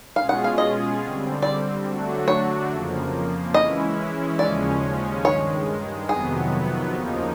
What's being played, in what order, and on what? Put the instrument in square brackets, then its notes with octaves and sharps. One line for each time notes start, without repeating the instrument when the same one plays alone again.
[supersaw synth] B2 G#3 C#4 F4 G#4 [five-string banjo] F5
[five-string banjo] F#5
F5
D#5
[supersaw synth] D3 G3 C4
[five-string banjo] D5
[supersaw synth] D3 F#3 A3 D4 F#4
[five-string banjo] C#5
[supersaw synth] F2 C#3 F3 A#3
[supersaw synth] E3 G#3 C#4 E4 [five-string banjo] D#5
[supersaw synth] D#2 C#3 F3 G#3 C#4 [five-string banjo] D5
[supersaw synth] G2 D#3 G#3 [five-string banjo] C#5
[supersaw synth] F2 C3 D#3 F#3 B3 [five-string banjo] G#4
[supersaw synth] D#2 C#3 F3 A#3 D#4